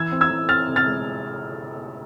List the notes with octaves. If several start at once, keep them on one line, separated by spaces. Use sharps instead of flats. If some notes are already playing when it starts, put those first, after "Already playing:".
Already playing: E3 E6 G#6
C4
E6 G#6
E3
C4 F6 A6
C3
F6 A6
G#3